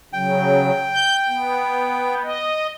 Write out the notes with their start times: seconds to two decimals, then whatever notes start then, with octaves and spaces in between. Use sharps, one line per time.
0.13 C#3 F#3 G5
0.93 G6
1.27 B3
2.23 D#5